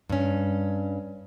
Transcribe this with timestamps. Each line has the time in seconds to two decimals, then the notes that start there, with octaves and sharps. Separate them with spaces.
0.10 G2 C#4